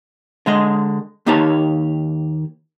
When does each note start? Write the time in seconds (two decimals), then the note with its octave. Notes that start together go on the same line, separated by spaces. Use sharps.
0.46 D3 G#3 D#5
1.26 D#2 A#3 D#4 G4 C#5 A5